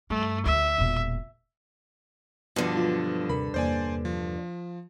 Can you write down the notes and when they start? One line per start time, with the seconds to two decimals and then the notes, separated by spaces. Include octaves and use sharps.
0.10 G2 A3
0.46 D2 E5
0.78 E1 A#2
2.56 G2 B2 D3 F3
2.75 F#3 F4
3.29 D#2 C3 A#4 B5
3.54 E2 C3 A#3 C5 D5 G#5
4.05 F3